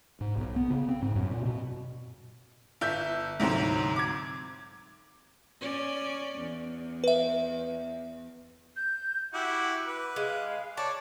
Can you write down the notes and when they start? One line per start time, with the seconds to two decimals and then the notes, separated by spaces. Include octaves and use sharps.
0.21 G#2
0.37 B1
0.56 B3
0.70 C#3
0.89 C4
1.02 G#2
1.15 F#2
1.31 A#2
1.45 B2
2.81 G1 E5 G6
3.40 D2 G#2 C3 F#3 C4
3.96 D6 G#6
5.61 C#4 D5
6.38 E2
7.04 B4 E5
8.76 G6
9.34 E4 F#4 G4 D6
9.87 B4
10.16 G#3 F5
10.77 C#5 D5 A5